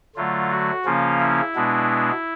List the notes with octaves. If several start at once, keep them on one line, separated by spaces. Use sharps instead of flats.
D3 F#3 A3 F4
F#4
C#3 F3 A#3 C#4 F4
E4
B2 G#3 B3 D4